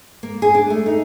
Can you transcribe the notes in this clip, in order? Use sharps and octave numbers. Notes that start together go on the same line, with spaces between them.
A#3
G#4
D4
A3
D#4